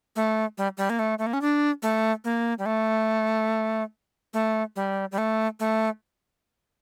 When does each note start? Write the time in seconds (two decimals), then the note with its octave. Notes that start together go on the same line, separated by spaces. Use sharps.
0.16 A3
0.58 G3
0.77 G3
0.90 A#3
0.99 A3
1.19 A3
1.26 A#3
1.33 C#4
1.41 D4
1.82 A3
2.24 A#3
2.59 G3
2.66 A3
4.33 A3
4.76 G3
5.12 G3
5.18 A3
5.60 A3